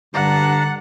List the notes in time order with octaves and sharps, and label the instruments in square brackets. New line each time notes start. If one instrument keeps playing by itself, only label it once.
[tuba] G2 [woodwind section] D3 [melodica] D4 A5 A#5 [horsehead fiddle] F#5